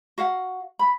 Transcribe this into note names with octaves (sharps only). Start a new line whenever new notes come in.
F#4 F5 F#5
B5